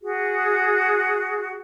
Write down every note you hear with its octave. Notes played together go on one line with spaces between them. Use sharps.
F#4 G#4